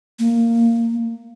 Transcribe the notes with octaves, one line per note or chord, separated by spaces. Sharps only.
A#3